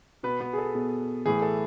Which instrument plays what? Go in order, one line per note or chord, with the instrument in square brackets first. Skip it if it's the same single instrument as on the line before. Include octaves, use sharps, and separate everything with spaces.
[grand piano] B2 B3 B4
B3 B4
G#4
A4
B2 G#4
A2 E3 G#4
A4